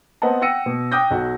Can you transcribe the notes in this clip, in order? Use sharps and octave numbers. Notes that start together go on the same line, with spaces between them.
B3 C4 D#5 F#5 A5
F#5 G5 E6 A#6 C#7 D#7
B2
G5 D6 D#6 F#6 G6 A#6
B1 F#4